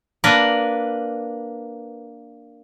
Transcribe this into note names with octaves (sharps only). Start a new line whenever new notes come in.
A#3 D4 A#4 B4